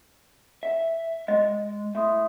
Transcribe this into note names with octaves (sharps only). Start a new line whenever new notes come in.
E5
G#3 D#5
A2 E5 C6 D#6